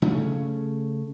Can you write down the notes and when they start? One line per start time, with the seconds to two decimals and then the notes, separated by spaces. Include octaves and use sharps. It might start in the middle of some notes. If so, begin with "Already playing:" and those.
0.02 C#3 A3 C#4